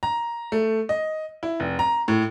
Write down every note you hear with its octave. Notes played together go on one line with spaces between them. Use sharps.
A#5
A3
D#5
E4
F1
A#5
A2